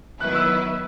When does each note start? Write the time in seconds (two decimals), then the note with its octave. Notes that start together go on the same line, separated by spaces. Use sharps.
0.20 D#3 F#3 B3 E4 B4 F#6
0.35 E6